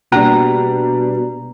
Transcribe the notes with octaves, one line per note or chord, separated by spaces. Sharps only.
B2 G3 A#3 D4 A#5